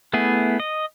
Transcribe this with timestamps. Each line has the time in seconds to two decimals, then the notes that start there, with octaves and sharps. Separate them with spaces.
0.13 A3 B3 E4 G#4
0.60 D#5